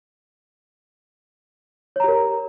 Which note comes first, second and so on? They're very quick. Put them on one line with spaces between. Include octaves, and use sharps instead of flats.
C#5 A#5 G4 A#4